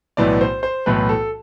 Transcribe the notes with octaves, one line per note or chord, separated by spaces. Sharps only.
B1 A2 E3 B3 E4 D5
C5
C5
B1 A2 E3 B3 E4 B4
A4